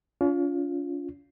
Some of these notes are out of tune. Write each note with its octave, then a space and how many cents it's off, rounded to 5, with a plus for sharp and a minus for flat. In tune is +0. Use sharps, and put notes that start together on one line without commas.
C#4 +40 F4 +0